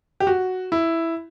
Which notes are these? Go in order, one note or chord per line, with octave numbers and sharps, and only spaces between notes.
G4
F#4
E4